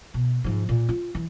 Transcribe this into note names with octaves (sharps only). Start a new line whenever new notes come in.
B2
G#2 F3
A#2
F4
E3